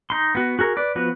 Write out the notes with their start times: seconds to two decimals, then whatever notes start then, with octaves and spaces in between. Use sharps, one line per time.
0.10 D#4 C6
0.35 B3 F#4
0.59 F#4 G#4 A#4
0.77 B4 D5
0.95 F3 B3 F#4 B4